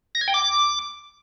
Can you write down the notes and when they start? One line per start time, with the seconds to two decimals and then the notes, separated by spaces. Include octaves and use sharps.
0.15 A#6
0.21 G#6
0.28 G5
0.34 D6